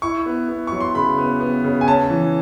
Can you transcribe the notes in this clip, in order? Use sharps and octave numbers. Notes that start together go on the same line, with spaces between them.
E4 C#6
B3
B3
F#3 C#6
C6
C#3 B5
B3
B3
C#3
G#5
C#4 A5
E3